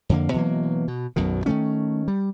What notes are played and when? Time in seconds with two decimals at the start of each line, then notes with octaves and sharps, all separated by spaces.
0.09 F2 D3 A#3
0.34 B2 E3 F#3 A#3
0.88 B2
1.16 B1 F#2 B2 D#3
1.46 D#3 F#3 A3 C#4
2.08 G3